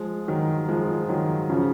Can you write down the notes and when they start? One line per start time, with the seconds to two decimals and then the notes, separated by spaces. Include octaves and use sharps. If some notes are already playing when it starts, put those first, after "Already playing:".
Already playing: F3 G#3
0.28 D#3 F#3
0.68 F3 G#3
1.09 D#3 F#3
1.50 C#3 F3